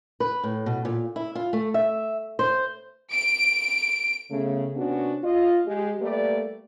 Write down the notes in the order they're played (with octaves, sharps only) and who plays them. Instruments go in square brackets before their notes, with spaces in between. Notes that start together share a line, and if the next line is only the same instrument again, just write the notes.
[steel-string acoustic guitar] B4
A2
B2
A#2
E4
F4
A3
E5
C5
[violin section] D7
[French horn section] C#3 A3 B3
C3 B3 C#4 D4 F#4
F4 D#5
G#3 G4
G3 A3 A#3 G4 B4 D5